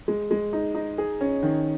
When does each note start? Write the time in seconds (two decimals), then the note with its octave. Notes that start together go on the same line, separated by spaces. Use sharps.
0.08 G#3
0.31 G#3
0.53 D#4
0.75 D#4
0.98 G#4
1.21 C#4
1.43 D#3